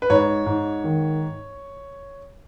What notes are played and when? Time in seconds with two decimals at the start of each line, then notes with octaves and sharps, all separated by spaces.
0.02 B4
0.10 G#2 C#5
0.46 G#2
0.84 D#3